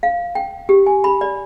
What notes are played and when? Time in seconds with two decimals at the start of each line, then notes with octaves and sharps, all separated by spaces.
0.03 F5
0.35 G5
0.69 G4
0.86 G#5
1.04 B5
1.21 D5